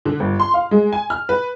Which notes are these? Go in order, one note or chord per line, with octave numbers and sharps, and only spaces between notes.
D3
G1
C6
F5
G#3
G#5
F6
B4